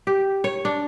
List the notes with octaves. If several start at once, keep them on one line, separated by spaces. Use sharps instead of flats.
G4
C#5
D4